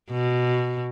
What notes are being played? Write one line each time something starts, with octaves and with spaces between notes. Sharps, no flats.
B2